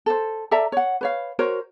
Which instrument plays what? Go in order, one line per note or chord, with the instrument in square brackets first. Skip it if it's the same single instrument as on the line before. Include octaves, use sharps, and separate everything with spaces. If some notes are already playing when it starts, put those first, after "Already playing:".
[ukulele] A4 C5
A4 D5 E5 A#5
C#5 F#5
B4 C#5 F5
F#4 A#4 C5 C#5